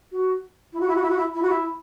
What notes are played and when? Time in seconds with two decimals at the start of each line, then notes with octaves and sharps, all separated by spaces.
0.12 F#4
0.73 E4
0.80 F#4
0.88 E4
0.95 F#4
1.02 E4
1.10 F#4
1.17 E4
1.34 E4
1.42 F#4
1.50 E4